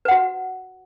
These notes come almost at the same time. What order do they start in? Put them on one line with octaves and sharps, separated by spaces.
B4 F#5 F#4